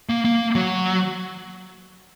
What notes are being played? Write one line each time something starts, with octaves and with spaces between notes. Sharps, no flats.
A#3
A#3
F#3